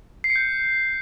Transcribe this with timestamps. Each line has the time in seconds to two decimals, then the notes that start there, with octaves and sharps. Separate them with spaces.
0.24 C7
0.30 C#7
0.36 G6